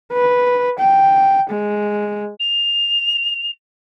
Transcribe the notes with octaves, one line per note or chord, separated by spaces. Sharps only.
B4
G5
G#3
F7